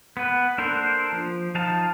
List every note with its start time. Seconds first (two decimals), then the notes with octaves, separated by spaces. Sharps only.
0.17 B3 B4
0.58 A#3 D4 A4 A#4 C5
1.12 F3
1.55 F3 D#4 F4 F5 A5